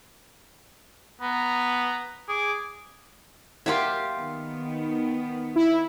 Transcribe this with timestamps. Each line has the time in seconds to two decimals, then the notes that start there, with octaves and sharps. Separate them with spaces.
1.21 B3 A#5
2.28 G#4 D6
3.66 F#3 A#3 F4 G4 E5
4.16 D#3 B3
5.56 E4